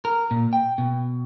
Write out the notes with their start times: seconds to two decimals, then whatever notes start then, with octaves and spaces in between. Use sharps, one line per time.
0.05 A#4
0.31 A#2
0.53 G5
0.78 B2